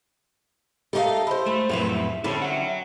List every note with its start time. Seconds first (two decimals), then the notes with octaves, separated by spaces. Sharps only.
0.93 A3 D#4 G4 A4 D#5 F5
1.27 E4 G#4 C5
1.46 G#3 A3
1.69 F2 A2 C3 F#3 E4 B4 F5
2.24 D3 G3 C4 C#4 E4 F#4 A4 E5
2.42 C#5 F#5